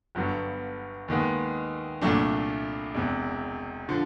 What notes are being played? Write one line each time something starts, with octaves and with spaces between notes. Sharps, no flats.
G1 G2 D3 F#3 B3
D#2 D#3 G#3 B3
C2 A#2 F#3 A3 D4
E1 E2 C3
D3 F3